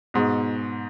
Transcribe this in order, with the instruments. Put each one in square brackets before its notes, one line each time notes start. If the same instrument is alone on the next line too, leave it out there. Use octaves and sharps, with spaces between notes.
[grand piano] G#2 B2